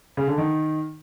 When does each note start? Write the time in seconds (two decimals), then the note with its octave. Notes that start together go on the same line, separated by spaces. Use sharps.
0.17 C#3
0.28 D3
0.38 D#3